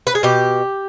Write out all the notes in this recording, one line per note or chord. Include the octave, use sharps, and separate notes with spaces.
B4
G#4
B2 G4